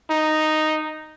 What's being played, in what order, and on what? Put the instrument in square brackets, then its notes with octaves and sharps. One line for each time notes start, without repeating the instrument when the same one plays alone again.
[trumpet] D#4